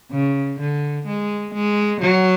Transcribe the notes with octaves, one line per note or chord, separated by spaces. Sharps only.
C#3
D3
G#3
G#3
F#3